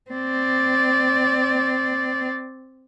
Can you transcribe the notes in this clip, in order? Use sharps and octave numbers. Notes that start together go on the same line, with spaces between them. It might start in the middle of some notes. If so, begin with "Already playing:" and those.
C4 D5